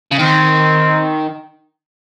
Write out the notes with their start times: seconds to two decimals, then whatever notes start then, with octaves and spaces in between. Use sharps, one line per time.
0.12 C#3
0.19 D#3 C4